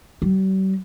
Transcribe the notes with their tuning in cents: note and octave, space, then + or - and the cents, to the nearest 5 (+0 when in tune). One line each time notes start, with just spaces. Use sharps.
G3 -45